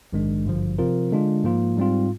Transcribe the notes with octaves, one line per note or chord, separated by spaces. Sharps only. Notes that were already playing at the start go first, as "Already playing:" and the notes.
A#1 G#2 D#3 G#3 D4
G#1 G2 D3 F3
C3 F3 C4 F4 A#4
D3 G#3 D4 F4
G#2 F3 A#3 F4
G#2 G3 C4 F4